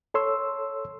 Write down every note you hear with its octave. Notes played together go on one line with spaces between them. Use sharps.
A4 C#5 C6 E6